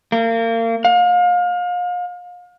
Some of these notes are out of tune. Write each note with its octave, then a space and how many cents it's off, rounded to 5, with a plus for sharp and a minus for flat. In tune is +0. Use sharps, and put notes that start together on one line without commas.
A#3 -35
F5 +35